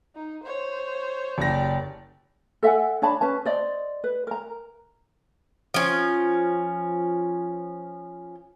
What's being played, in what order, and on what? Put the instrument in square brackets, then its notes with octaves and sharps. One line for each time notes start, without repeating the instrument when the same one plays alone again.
[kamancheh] D#4
C5 C#5
[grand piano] F#1 A#6 [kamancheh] G4 D5
[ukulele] A4 E5 F#5 G#5
D4 C#5 A5 B5
C#4 B4 A5
C5 D5 D#5
B4
A#4 A#5
[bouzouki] F3 C#4